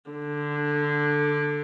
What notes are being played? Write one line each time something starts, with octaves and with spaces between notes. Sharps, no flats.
D3